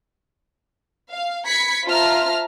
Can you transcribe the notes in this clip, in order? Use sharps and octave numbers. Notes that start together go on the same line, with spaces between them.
F5
B5 G#6 B6 C#7
F4 C5 E5 A5 A#5 F6